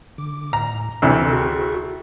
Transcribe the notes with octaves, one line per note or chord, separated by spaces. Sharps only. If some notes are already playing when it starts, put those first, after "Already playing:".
D3 D6
A2 A#5
D2 C3 E3 A4
F#4 G#4 C#6